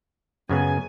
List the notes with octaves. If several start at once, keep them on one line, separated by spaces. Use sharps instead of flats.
F#2 C#3 B3 G#5